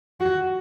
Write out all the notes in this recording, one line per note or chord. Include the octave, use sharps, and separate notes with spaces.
F#4